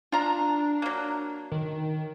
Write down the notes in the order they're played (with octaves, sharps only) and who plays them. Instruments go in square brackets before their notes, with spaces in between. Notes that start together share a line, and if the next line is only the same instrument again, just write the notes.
[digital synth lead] D4 [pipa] F4 A#5
[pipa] F#3 A#3
[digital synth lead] D#3